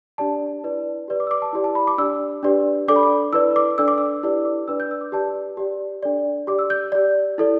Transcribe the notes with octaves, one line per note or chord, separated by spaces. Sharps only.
D4 G4 D5 A5
E4 B4 D5
G4 B4 D5
D6
E6
D6
A5
E4 G4 D5
A5
B5
D6
D4 G4 D5 E6
D4 G4 B4 D5
D4 A4 D5 D6
B5
D6
E4 B4 D5 E6
D6
D4 A4 D5 E6
D6
E6
E4 G4 B4 D5 E6
D6
D4 B4 D5 E6
G6
E6
D6
G4 B4 D5 A5
G4 D5
D4 A4 D5
G4 D5 D6
E6
G6
G4 D5
E4 A4 D5